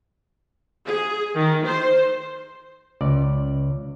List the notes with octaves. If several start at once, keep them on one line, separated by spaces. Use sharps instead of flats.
G#4
D#3
C5
C#2 D5